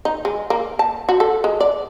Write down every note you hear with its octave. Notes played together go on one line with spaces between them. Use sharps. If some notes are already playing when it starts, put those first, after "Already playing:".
D#4
G#3
A#3
A5
F#4
A4
G#3
D5